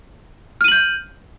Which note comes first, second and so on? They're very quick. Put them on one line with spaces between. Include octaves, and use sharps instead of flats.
F6 D#7 F#7 G6